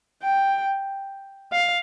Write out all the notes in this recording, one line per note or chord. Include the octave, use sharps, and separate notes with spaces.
G5
F5